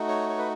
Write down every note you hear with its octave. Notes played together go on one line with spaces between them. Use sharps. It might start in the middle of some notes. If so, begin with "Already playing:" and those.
Already playing: A3 D#4 F#4
C#5
C#5
B4